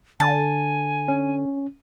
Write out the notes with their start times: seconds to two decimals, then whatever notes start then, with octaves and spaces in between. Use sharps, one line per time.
0.20 D3 G#5 A5
1.08 C#4